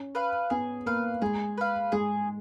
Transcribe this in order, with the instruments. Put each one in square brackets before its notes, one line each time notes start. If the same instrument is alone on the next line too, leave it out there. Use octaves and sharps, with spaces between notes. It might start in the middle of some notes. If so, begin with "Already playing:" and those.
Already playing: [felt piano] C#4
[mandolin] B4 F5
[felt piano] B3 [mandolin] G#4
[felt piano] A#3 [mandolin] B4 F5
[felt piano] G#3 [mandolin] G#4
[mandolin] B4 F5
[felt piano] G#3 [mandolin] G#4